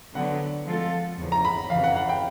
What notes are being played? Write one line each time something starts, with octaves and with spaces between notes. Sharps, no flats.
D3 F#3 B3 F#5
F3 G#3 C4 F4 A4
E2 C#3 F3
A#5
B5
F2 C#3 E3 F5
F#5
F#5
G5